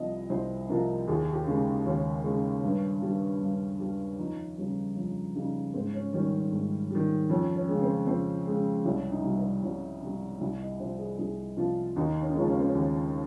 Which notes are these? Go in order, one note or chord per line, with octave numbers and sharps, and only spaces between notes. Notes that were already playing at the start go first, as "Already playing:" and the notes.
Already playing: C2 C3 F3 D#5
C2 C5
C3 F3 A#4
D#2 G#4
G4
C#3 G#3
D#2 C#4
C#3 G#3
G2
G3
G2
G3
F2 D#4
C#3 G3 C#4
F2 C#4
C#3 G3 D#4
G#2 C4
C#4
D#3 G3 C#4
C#4
G#2
D#3 G3
F2 C#4
C#4
C#3 G#3
C4
F2 C4
C#3 G#3
C2 C#4
D#4
C3 G3
C4
C2 C#4
C3 G3
C2 G4
D#5
C3 F3 C5
G#4
C2 G#4
C3 F3 F4
D#2 D#4
C#4
D#4
C#3 F3 G#3 C#4
C#4
C4
C#4
D#2